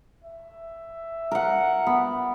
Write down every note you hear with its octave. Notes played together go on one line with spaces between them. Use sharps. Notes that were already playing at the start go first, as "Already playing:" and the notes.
E5
A#4 F#5
B3